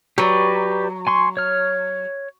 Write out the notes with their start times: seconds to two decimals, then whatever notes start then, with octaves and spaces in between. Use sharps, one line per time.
0.18 F#3 G4 B4 D5
1.07 G#5 C6 C#6
1.37 C#5 F6